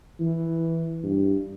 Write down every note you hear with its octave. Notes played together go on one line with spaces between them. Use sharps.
E3
G2